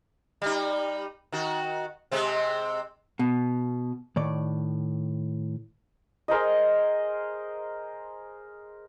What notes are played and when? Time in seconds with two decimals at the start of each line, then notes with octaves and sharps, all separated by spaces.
0.42 G3 D#4
1.32 D#3 F#4
2.11 C3 G#3 C4
3.19 B2
4.16 A2 D#3 D5
6.28 G#4 A#4 C5 D#5